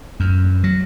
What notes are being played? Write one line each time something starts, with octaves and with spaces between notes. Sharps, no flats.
F#2
F#3